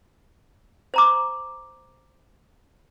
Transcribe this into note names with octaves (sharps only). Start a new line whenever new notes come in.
C5 A#5 D6